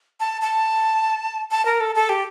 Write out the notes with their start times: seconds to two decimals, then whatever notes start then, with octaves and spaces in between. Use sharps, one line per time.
0.20 A5
0.42 A5
1.51 A5
1.65 A#4
1.80 A4
1.95 A4
2.09 G4